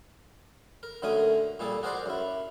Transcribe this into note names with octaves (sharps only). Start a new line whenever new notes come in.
A#4
F#2 D3 A3 A#4 G#5 D#6
A#2 G3 G#4 A4
F#4 G#4 A#4 C5 D5 F#5
F#2 E4